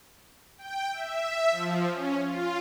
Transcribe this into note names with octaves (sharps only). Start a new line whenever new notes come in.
G5
E5
F3
C#4
F4